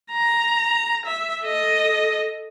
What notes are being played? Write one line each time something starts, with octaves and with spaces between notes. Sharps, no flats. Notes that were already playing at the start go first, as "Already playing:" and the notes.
A#5
E5
A4 D#5